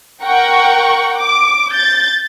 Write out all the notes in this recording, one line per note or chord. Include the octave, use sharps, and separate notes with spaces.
A#4 F#5 G5 C#6
D6
G6 A6